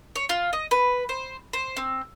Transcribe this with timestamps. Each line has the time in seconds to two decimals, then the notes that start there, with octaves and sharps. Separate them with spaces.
0.16 C#5
0.29 F4
0.53 D#5
0.71 B4
1.09 C5
1.53 C5
1.77 C4